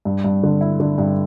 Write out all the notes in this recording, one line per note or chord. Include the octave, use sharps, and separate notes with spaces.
G2
G2
D3
E4
D3
G2